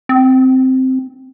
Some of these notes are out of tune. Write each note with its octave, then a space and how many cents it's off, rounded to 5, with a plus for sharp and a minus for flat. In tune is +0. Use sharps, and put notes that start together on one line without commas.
C4 -5